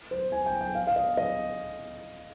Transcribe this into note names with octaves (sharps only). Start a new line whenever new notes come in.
C5
G#5
G5
G5
F5
F5
D#5
D#5